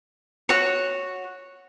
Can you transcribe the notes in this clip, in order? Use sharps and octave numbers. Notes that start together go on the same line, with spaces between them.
F#4 C#5